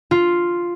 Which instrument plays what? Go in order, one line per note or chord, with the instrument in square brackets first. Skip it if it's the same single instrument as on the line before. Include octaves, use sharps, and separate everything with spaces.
[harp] F4